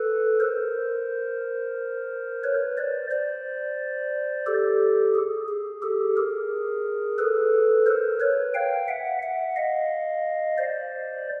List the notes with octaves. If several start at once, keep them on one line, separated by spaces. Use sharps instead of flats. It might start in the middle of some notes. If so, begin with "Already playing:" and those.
Already playing: A4 B4
A#4 C5
B4 C#5
C5 D5
C5 D5
G4 A4
G#4
G#4
G4 A4
G#4 A#4
A4 B4
A#4 C5
B4 C#5
F5 G5
E5 F#5
E5 F#5
D#5 F5
C5 D5